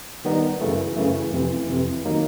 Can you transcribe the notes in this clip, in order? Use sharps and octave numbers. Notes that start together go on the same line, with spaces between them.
D#3 G3 B3 D#4
F#2 C#3 E3 A3
F#2 C#3 E3 A3
F2 C3 E3
F2 C3 E3
D#3 F#3 A#3 D#4